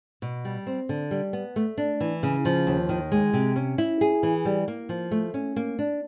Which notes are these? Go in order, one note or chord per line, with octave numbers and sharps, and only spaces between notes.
B2
G3
C4
D3
G3
B3
A3
D4
E3
C#3
F3
D#2
D#3
G#3
C3
C#4
E4
G#4
E3
G3
A#3
F3
A3
C#4
A#3
D4